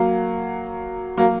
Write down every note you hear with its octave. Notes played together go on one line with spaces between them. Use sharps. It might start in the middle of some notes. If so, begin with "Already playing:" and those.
Already playing: F#3 A#3
F#3 A#3